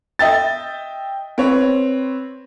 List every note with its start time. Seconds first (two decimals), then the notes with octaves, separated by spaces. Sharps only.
0.19 D#5 E5 G5 A6
1.38 C4 B4 C#5